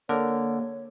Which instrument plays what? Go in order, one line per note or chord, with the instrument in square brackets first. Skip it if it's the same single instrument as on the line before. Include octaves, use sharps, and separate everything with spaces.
[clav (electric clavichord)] D3 [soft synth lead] A#3 [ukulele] A#4 [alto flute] C#5